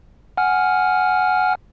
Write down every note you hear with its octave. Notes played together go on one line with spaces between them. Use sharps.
F#5 G#5 F6